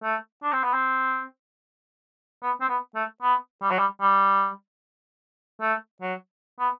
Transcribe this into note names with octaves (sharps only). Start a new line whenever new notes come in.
A3
D4
C4
B3
C4
B3
C4
B3
A3
B3
G3
F#3
G3
G3
A3
F#3
B3